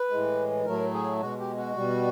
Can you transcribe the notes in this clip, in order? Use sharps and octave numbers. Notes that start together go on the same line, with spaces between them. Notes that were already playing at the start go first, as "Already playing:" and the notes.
Already playing: B4
A2 E3 G#3
A2 F#3 A3 A#4
G#4
B2 G#3 F#4
G4
F#4
B2 G3